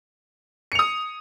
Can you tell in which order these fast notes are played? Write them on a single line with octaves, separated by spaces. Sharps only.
C#7 F7 D#6